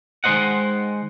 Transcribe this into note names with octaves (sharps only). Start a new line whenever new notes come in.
D#3 G#3 B3 C5 D#5 F#5